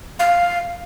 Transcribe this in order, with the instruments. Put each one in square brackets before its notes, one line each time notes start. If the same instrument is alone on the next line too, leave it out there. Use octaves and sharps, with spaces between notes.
[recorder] F5